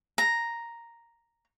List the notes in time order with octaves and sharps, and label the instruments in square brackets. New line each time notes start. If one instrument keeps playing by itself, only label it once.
[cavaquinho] A#5